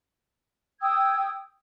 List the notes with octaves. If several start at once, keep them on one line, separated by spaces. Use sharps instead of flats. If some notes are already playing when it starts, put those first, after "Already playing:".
G5 D#6 E6 G#6